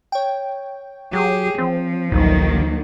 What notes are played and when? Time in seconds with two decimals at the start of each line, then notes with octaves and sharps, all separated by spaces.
0.12 C#5 G5
1.13 F#3 G4 G#4
1.58 F3 C4
2.12 A1 D2 D#3 F#3 A#3